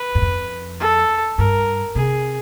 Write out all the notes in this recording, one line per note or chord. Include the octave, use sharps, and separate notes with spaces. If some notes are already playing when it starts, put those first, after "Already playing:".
Already playing: B4
F#2
F2
A4
G2 A#4
C3 G#4